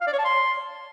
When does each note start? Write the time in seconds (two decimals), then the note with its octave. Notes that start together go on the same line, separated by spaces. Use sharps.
0.01 F5
0.07 D5
0.13 C#5
0.19 A5
0.25 C6